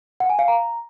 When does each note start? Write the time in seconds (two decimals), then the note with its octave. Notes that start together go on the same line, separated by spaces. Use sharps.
0.20 F#5
0.30 G#5
0.39 F5
0.48 A#5